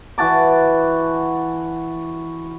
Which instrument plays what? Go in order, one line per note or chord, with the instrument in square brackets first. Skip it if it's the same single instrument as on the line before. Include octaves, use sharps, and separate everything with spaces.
[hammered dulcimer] E3 F#4 A5 D6